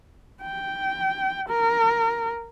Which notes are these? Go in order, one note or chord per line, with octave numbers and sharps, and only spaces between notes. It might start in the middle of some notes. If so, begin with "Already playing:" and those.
G5
A#4